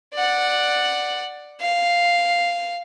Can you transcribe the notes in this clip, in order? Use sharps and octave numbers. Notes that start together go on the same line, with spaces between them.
D5 F#5
F5